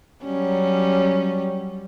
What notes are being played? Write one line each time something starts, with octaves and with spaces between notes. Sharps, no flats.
F#3 G3 C#4